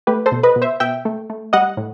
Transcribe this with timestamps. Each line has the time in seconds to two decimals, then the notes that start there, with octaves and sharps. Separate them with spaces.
0.07 A3 G4 B4
0.26 A4 C5
0.32 B2
0.43 B4 D#5
0.56 B2
0.62 C5 E5
0.80 B2 E5 G5
1.05 A3
1.30 A3
1.53 G3 D#5 F#5
1.77 A2